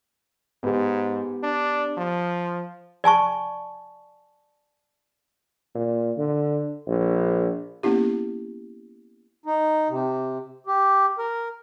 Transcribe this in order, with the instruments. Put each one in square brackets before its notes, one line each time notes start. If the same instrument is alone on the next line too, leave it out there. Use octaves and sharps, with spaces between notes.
[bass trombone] G#2 [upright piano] B3 G4
[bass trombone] D4
F3
[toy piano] D5 G#5 A5 C#6
[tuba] A#2
D3
A#1
[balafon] A#3 B3 C#4 E4 G4
[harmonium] D#4
C3
G4
A#4